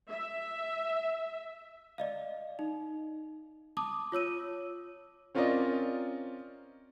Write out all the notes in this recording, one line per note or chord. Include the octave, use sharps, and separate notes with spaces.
E5
D5 D#5 F5
D#4
A5 D6 D#6
F4 C#5 E6 D#7
C4 C#4 F4 A#4 D5 D#5